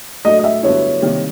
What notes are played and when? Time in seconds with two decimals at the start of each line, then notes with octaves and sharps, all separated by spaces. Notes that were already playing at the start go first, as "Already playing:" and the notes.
0.24 A2 F#3 A3 D4 D#5
0.39 D#5
0.44 E5
0.63 G2 D3 F#3 B3 E4 C#5
1.02 C3 D#3 G3 A#3